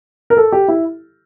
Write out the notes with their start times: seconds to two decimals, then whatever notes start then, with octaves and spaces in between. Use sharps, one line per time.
0.30 A#4
0.37 A4
0.52 G4
0.68 E4